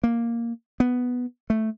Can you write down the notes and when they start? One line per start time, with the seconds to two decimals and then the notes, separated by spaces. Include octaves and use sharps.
0.03 A#3
0.80 B3
1.50 A3